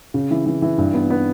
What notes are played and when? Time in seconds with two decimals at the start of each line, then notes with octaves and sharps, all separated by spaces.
0.14 C#3
0.31 E3
0.46 E3
0.62 E3
0.78 G2
0.94 B3
1.10 B3